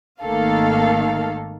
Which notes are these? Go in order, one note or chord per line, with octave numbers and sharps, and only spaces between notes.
G#1 D#3 A3 A#3 A4 F5